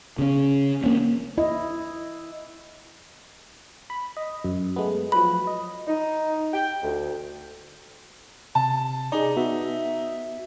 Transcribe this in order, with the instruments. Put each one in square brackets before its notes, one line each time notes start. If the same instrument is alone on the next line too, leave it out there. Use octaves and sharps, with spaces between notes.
[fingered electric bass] C#3 C#4
A#3 C4 C#4
[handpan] E4 D#5
[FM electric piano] B5
D#5
F#2
G#3 A3 B3
[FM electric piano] F3 F#3 B4 [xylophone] B5
[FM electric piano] D#5
[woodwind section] D#4
G5
D2
[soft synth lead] C3 [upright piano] A5
[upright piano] D#4 [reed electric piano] G#4 D5
[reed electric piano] B3 F#4 [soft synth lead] E5